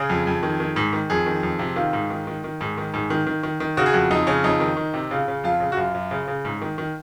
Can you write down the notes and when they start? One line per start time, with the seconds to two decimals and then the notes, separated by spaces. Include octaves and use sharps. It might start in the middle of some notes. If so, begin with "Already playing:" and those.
Already playing: C#3 G#4
0.09 F2
0.27 F2
0.43 D#3
0.60 D#3
0.76 G#2
0.93 D#3
1.10 F2 G#4
1.26 D#3
1.43 F2
1.59 C3
1.76 D#3 F4
1.93 G#2
2.10 D#3
2.27 D#3
2.44 D#3
2.61 G#2
2.77 D#3
2.94 G#2
3.10 D#3
3.27 D#3
3.43 D#3
3.60 D#3
3.77 C#3 F#4
3.86 G#4
3.93 F2 F#4
4.11 F2 D#4
4.27 C#3 C#4
4.44 F2 D#4
4.60 D#3
4.77 D#3
4.94 C3
5.11 C#3 F4
5.28 C#3
5.44 F2 F4
5.60 C#3
5.72 F#4
5.77 F#2 F4
5.94 F#2
6.11 C#3
6.28 C#3
6.45 G#2
6.62 D#3
6.78 D#3